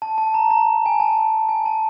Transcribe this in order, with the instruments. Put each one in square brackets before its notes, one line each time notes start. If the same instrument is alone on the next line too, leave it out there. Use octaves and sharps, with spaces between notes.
[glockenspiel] A5
A5
A#5
A#5
G#5
A5
G#5
A5